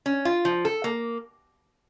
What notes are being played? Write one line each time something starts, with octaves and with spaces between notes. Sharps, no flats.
C#4
F4
F3
A4
A#3